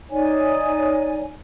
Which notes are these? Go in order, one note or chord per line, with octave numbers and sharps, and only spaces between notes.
D#4 C#5 D5 G#5